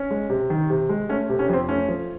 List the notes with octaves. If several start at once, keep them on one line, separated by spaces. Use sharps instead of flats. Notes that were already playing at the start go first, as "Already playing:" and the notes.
Already playing: C#4
G#3
C3
D#3
C3
G#3
A3 C#4
C3
C#4
F2 C4
A3 C#4
F3